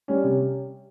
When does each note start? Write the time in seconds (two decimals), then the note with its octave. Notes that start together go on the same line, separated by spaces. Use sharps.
0.08 G3 C#4
0.24 C3